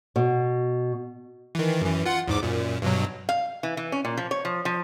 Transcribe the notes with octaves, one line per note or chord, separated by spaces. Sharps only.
B2
D#3 E3
F#2 E3
F4 F#5
E2 G#2 D6
F#2 A#2
G2 B2 F#3
F5
E3
E3
C#4
A#2
F3
C#5
F3
F3